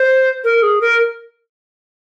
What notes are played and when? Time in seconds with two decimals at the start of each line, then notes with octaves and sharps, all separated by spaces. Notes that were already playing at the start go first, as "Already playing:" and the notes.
Already playing: C5
0.44 A#4
0.63 G#4
0.81 A#4